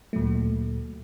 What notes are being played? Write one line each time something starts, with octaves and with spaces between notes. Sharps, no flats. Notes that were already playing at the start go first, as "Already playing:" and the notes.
D2 A#2 F#3 A3